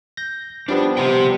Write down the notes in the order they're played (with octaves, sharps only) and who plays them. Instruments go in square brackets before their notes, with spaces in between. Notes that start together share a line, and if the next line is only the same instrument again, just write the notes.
[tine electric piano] G6 A#6
[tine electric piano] F3 G3 B3 [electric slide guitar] D4
[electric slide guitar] G4 C5 G5